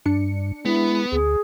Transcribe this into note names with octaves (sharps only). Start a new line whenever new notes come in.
G2 D4 C#7
G#3 B3 E4
D2 G#4